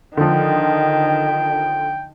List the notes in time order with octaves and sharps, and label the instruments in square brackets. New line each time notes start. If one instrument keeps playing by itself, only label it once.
[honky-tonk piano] D3 F3 [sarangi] D#3 [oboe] G5